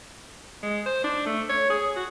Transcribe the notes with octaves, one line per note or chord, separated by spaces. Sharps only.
G#3
C5
D4
A3
C#5
G#4
F#4